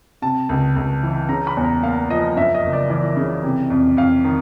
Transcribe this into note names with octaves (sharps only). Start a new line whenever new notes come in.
C3 A5
C#2
C#2
E3
C#3 A#5
B5
E2
A#5
A#3 F5
F3 D#5
F#2 E5
D#5
F#1
D5
E3 D5
C#3
C3
F2
F2 F5
D#3